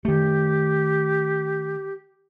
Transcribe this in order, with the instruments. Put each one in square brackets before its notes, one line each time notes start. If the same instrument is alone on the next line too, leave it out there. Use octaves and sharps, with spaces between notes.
[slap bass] D#3 A3 [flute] G4